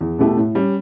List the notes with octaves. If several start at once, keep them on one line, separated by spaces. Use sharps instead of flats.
E2
B2 A3 E4 G4
A2
G3 C#4